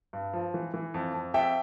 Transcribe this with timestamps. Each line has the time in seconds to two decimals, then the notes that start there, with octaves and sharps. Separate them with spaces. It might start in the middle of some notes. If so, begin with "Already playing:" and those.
0.13 G2
0.33 F3
0.54 E3
0.74 E3
0.94 F2
1.14 F2
1.34 F2 E5 G5